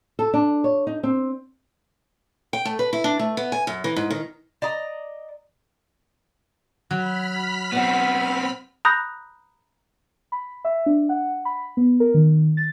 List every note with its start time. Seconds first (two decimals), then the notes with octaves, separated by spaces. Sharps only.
0.19 A4
0.34 D4
0.64 C#5
0.87 D#4
1.03 C4
2.53 G5
2.65 A3
2.79 B4
2.93 E4
3.04 D4
3.19 A3
3.37 B3
3.52 G#5
3.67 F#2
3.84 E3
3.96 G#2
4.11 D#3
4.62 D5 D#5 A#5
6.91 F#3 B5 F6 B6
7.73 B2 B3 C4 F#5
8.85 A#5 B5 D#6 F#6 G6 A#6
10.32 B5
10.65 E5
10.86 D4
11.09 F#5
11.45 B5
11.77 B3
12.00 A#4
12.14 D#3
12.57 A6